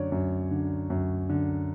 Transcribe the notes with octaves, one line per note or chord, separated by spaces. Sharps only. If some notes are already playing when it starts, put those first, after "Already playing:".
Already playing: F#2 D3 C#5 D5
F#2
D3
F#2
D3